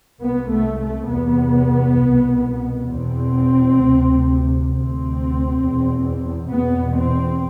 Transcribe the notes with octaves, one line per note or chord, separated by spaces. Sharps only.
C2 C3 B3
A3
A3
E2 C3 B3
C2
B2
E2 B2 C4
D2 C3
D2 C3 C4
E2 B2
E2 B2 B3
C4